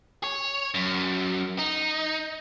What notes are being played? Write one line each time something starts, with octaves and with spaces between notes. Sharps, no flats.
C#5
F#2
D#4